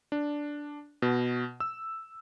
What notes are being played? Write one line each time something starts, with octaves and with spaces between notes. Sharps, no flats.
D4
B2
E6